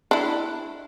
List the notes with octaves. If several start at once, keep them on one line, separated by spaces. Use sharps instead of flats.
D4 E4